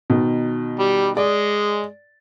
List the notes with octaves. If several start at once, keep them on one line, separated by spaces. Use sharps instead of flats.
B2 D#3
G3
G#3 D5